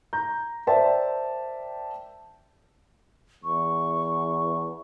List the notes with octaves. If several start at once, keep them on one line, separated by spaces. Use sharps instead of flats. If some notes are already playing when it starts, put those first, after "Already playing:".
A#5 G6
A#4 C5 D5 E5 G5 A5
E2 C#6